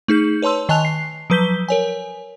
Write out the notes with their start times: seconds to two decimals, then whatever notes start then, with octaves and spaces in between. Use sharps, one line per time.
0.08 A3 D#4 G#4 G6
0.42 B4 C#5 A5 C6 E6
0.69 D#3 D#5 G#5 A5 F#6 F7
0.85 C7
1.30 F3 F#3 B4 G6 B6 G7
1.68 A#4 C#5 G#5